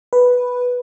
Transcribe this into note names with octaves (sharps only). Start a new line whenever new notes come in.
B4